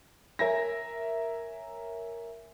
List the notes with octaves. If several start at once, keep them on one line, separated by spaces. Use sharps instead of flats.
A#4 C#5 E5 G#5 A#6